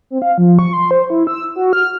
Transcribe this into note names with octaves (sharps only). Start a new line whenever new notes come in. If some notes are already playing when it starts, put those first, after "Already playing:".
C4
F5
F3
C#6
C6
C5
E4
E6
F#4
F6